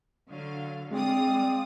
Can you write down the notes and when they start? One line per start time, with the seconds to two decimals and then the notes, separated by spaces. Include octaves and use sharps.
0.30 D3 F#3 F5
0.91 G#3 C4 D5 F5 D#6